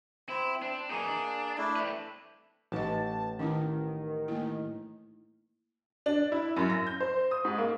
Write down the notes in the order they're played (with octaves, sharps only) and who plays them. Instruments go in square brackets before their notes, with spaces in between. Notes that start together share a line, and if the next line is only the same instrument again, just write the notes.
[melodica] C4 [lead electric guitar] E4
[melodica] C4 [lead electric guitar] D4
[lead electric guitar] E3 D#4 [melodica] A#3 G#4
[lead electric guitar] D4
[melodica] A3 D4 E4
[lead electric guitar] C4 B4
[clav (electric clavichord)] A1 [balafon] D#4 D#5 [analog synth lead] A5
[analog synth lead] D#3 [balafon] C#4 D#4 E4
[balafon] A3 A#3 E4
[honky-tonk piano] D4
E4
F#2
A#6
G6
C5
D#6
G#2
A#3